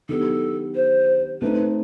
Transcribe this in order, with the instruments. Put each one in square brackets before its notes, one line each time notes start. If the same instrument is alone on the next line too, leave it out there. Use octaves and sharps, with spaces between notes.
[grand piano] D#3 F#3 B3 D4 G4 [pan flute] A4
[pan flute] C5
[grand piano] A3 C4 D#4 [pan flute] B4